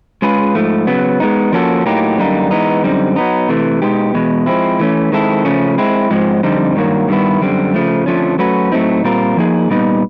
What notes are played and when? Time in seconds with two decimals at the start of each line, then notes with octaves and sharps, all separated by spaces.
0.22 G#3 C#4 F4 G#4 B4
0.55 G#2 F3 A3
0.87 C#3 F#3 B3
1.20 G#3 B3 D#4
1.53 F3 A#3 C#4 F#4 A4
1.86 A2 F#3 A#3 D#4 G4
2.18 F#2 D3 G3 A#3 D#4
2.51 E3 G#3 B3 D#4
2.84 F#2 D3 G3 C4 D#4
3.16 F#3 B3 D#4
3.49 C3 E3 A3
3.82 B2 G#3 B3 D#4 G4
4.15 E2 B2 G#3
4.46 F3 G#3 C4 E4
4.80 E3 A3 C#4
5.12 D#3 G#3 C4 E4 A4
5.45 C#3 F3 A3 C#4
5.78 G#3 C4 E4
6.10 G#2 F3 G#3 C4
6.43 F2 D3 G3 C4 D#4
6.76 G2 D#3 F#3 A#3
7.08 G2 D#3 G3 B3 E4
7.41 F#2 D3 G3 C4
7.74 C#3 F3 A3
8.06 F2 D3 F3 A3 C#4
8.39 F#3 A3 C#4 F#4 B4
8.72 A2 F#3 A3 C4 D#4
9.04 A#2 G3 C4 F4 A#4
9.37 F3 A#3 D#4 G#4
9.70 A#2 G3 B3 D#4